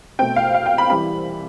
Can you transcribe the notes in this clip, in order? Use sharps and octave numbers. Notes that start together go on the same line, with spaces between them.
B2 A3 C4 G5
F5
F5
G5
B5
E3 G3 C4 B5